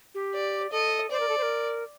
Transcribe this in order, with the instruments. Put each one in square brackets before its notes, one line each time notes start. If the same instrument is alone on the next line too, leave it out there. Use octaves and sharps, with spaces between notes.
[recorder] G4
[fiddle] D5
[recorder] A4 [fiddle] D#5
[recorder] C5 [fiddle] D5
[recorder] A#4
A4
C5
A#4